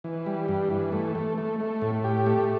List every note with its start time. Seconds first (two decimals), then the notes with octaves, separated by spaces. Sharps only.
0.04 E3
0.26 G3
0.48 G2
0.70 E3
0.92 A3
1.15 A3
1.38 A3
1.60 A3
1.82 A2
2.04 G4
2.26 A3